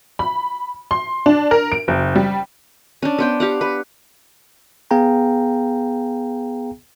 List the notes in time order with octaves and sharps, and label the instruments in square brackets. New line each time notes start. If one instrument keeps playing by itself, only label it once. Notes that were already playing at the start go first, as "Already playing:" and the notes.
[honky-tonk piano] B5
C6
D4
A#4
D7
F#1
G3
[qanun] C#4 D4
B3 C5 G5
G4 F5 F#5
B4
[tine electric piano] B3 G#4 F5 G5 A#5